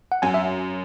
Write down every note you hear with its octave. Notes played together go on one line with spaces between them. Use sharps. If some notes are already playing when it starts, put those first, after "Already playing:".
F#5
F#2 G#5
E5